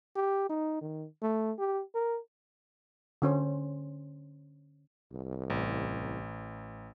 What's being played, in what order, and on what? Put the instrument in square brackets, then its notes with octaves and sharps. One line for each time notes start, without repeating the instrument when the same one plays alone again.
[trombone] G4
D#4
D#3
A3
G4
A#4
[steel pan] D3 C#4 C5
[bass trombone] C2
[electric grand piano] A1